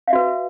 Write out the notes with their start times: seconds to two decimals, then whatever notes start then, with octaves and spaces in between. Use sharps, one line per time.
0.08 F5
0.10 E5
0.13 F#4
0.15 B4